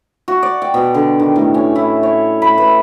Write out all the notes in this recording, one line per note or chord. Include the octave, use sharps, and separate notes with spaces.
F#4
D5
G5
B2
D3
D#3
A2
C#4
E4
C#5
B5
B4